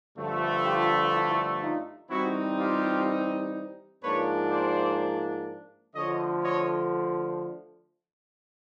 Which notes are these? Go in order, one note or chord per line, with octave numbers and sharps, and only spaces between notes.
G2 D3 F3 A3
F4 G4
E4
D#4 F4
E3 G3 C4 D#4 E4 F#4
F4 G4
G#2 F3 A#3 D4 B4 C#5
C5 D5
D3 F3 A3 C#5 D#5
C#5 D#5